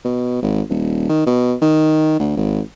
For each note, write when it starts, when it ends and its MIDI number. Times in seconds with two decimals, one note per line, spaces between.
0.05 0.41 47
0.42 0.61 32
0.69 1.07 27
1.09 1.22 51
1.26 1.54 47
1.61 2.19 51
2.19 2.36 38
2.37 2.60 32